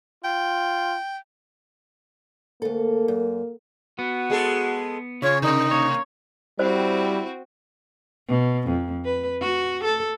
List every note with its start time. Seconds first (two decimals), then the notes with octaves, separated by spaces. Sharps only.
0.24 F4 G5
2.62 D2 A#3 A4
3.08 F#2
3.99 B3 F#4
4.30 G#3 G#4 A4
5.22 C#3 C#4 F4 C#5
5.42 C3 D#4 A#4
5.71 A#3 C#5
6.59 G3 C4 E4 F#4 C5
8.28 B2
8.68 F2
9.05 B4
9.41 F#4
9.84 A4